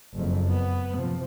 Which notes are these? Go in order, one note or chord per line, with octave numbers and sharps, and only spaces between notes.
F#1 F2
B3
C3 F3